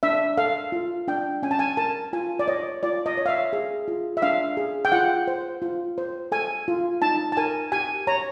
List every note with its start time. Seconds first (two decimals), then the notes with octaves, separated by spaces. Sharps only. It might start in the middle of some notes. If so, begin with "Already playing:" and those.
0.03 D4 E5
0.37 A4 F5
0.72 F4
1.08 D4 G5
1.43 C#4 G#5
1.51 A5
1.59 G#5
1.77 A#4 A5
2.13 F4 G#5
2.39 D5
2.48 C#5 D#5
2.83 F4 D5
3.06 D#5
3.17 C#5
3.26 F5
3.29 E5
3.53 G#4
3.88 F4
4.17 E5
4.22 D4 F5
4.57 G#4
4.85 G5
4.92 F4 F#5
5.28 C5
5.62 F4
5.98 C5
6.32 A4 G#5
6.68 F4
7.02 D#4 A5
7.32 A5
7.37 A#4 G#5
7.72 G4 G#5
8.07 C#5 A#5